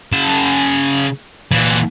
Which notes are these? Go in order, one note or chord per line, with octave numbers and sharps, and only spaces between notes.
C#3 A5
A#2 E3